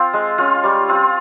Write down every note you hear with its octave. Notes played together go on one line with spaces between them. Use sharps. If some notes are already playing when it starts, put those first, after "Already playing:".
Already playing: C4 F4
G#3
C#4 F4
G3 C#6
C4 F4